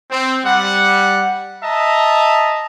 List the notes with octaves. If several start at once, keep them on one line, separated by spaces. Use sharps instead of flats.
C4
G3 F#5
D#5 E5 A5 A#5